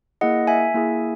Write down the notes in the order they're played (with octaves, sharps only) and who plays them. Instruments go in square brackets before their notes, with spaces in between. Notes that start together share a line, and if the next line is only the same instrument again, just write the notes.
[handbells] A#3 E4 G#4 D#5 F#5
E5 G#5
A#3 E4 G#4